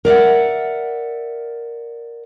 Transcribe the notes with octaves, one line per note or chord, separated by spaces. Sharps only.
A#4 D5 E5 F#5